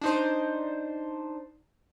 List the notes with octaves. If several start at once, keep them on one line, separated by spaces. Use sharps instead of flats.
D4 D#4 C5